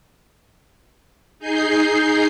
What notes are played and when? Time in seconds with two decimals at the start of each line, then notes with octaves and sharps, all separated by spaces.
1.39 D#4 G#4 G6 C7